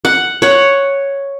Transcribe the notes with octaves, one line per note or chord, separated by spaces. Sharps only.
F#5
C#5 F#5